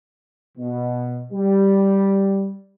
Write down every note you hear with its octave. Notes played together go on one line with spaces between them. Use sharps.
B2
G3